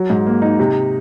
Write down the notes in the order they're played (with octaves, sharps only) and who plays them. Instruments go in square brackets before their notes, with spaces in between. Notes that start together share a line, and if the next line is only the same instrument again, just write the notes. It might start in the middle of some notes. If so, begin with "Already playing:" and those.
Already playing: [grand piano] F#3
G#2
A#3
D#4
C3